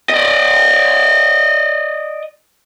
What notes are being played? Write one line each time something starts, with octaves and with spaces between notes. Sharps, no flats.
D5 D#5